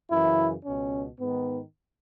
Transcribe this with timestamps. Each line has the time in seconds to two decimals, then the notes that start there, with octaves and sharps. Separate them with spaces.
0.11 F#2 C#3 E3 E4
0.65 C#2 B2 C#4
1.20 G#2 D#3 B3